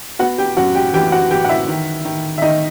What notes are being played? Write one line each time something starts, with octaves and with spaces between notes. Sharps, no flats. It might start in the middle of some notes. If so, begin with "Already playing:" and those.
B3 F#4 F#5
G4 G5
F#2 F#4 F#5
G4 G5
E3 G4 G5
F#4 F#5
E3 G4 G5
F#5
E4 E5
D#3
D#3
E5
D#3 D#4 D#5